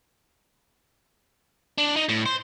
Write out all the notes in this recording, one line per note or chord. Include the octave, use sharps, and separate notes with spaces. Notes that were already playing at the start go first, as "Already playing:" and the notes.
D4
D#4
A2
C5